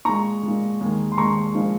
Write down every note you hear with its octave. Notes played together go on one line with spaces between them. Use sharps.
A#2 G#3 A#5 C#6
A#2 G#3
D#2 D#3 G#3
C6
D#2 D#3 G#3 A#5 C#6
A#2 F3 G#3